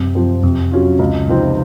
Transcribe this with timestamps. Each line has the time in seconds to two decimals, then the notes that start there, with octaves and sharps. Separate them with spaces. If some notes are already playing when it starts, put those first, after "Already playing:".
Already playing: F#2 C3
0.15 F3 C4
0.43 F2 C3
0.71 F#3 C#4 F4
0.99 C#2
1.28 C3 F3 C4 D#4